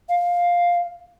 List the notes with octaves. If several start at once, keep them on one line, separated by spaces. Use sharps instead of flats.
F5